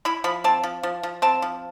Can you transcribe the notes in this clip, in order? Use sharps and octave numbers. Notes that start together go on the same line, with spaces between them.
E4 B5
F3 B5
C4 A5
F3
F3
F3
C4 A5
F3